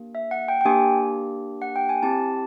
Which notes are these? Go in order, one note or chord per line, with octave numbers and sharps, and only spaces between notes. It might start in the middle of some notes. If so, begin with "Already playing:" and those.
Already playing: A#3 D4 G4
E5
F#5
G5
G5
A#3 D4 G4 G#5
F#5
G5
G#5
C4 E4 G4 A5